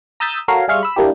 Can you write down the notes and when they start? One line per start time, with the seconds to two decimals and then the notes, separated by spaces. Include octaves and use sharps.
0.20 A#5 D#6 E6 G6 A6 B6
0.48 F#4 A4 A#4 C#5 F5
0.68 G3 G#4 E5 F5 C6 C#6
0.83 B5 E6
0.96 G3 A#3 D4 E4 G4